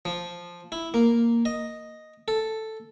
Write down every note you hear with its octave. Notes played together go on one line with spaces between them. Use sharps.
F3
E4
A#3
D#5
A4